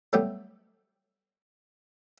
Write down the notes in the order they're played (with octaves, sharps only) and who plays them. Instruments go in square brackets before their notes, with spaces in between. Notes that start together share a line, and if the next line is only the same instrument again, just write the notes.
[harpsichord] F#3 G3 A3 B3 G4 E5